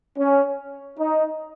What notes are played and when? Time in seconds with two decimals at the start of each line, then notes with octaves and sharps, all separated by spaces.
0.18 C#4
0.99 D#4